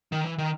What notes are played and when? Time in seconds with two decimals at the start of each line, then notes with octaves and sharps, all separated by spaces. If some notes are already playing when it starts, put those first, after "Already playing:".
0.12 D#3
0.24 E3
0.38 D#3